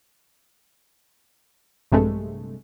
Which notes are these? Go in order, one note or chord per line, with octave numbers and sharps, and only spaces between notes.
A#1 G2 C3 G#3 A3